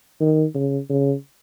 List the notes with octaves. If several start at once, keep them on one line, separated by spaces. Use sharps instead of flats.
D#3
C#3
C#3